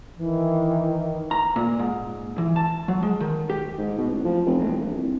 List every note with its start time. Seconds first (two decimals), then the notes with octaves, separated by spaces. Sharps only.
0.17 D#3 E3
1.31 A#5
1.56 A#2
1.79 G#2
2.38 E3
2.56 A5
2.88 F#3
3.03 G#3
3.20 D#3
3.50 G4
3.78 G#2
3.98 B2
4.11 A1
4.25 F3
4.46 F1
4.59 E1
4.81 A#1
4.95 C2